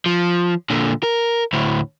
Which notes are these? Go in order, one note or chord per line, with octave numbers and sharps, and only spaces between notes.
F3
A#2 D3
A#4
D2 A2